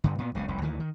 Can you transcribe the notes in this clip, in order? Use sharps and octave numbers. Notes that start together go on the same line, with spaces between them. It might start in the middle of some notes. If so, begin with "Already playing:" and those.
G2 D3
A#2 B3
F#1 C#2 C#3
F1 C2
D2 D#3 E3
D#3